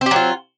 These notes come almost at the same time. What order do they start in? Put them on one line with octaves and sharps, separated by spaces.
C4 G4 F#3 F4